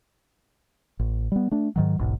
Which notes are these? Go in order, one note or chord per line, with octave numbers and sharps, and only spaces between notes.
A1
G3 B3
A3 D4
G#2 D#3 F#3
E1 B1 G#2